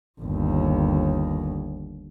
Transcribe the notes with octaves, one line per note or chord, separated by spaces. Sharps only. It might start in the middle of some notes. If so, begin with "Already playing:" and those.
G1 D#2